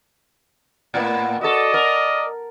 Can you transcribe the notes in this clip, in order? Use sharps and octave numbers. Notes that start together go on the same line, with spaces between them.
A2 A#3 B3
F#4 A4 D5 D#5
A#4